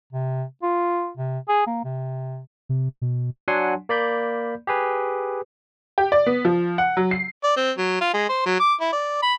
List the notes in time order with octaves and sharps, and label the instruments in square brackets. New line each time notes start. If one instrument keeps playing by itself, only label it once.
[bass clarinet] C3
F4
C3
G#4
A#3
C3
[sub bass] C3
B2
[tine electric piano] F#3 D4 F#5 G#5 C6
A#3 D5 B5 G6
G4 G#4 B4
[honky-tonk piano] G4
D5
B3
F3
F#5
F#3
C7
[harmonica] D5
C4
F#3
F4
G#3
C5
F#3
D6
E4
D5
B5